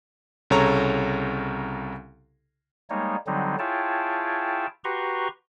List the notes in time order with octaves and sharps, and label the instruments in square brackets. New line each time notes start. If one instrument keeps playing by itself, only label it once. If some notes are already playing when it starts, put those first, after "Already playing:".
[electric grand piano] C2 C#3 A4 C#5 A#5
[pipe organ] G3 G#3 A#3 D#4 C#5
D3 F#3 G3 C4 D#4
E4 F4 G#4 C#5 G5 A5
F#4 G4 B4 A#5 C6 C#6